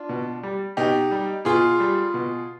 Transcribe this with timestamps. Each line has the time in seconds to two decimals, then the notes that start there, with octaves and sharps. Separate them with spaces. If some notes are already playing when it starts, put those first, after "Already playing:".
Already playing: D4 F4
0.09 B2
0.43 G3
0.77 B2 D#4 G4
1.11 G3
1.45 B2 F4 G#4
1.80 G3
2.14 B2